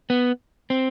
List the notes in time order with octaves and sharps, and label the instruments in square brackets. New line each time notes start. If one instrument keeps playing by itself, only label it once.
[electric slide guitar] B3
C4